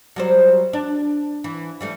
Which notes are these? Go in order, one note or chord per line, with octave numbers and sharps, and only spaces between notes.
F#3 G3 C5
D4
E3
E3 G3 A3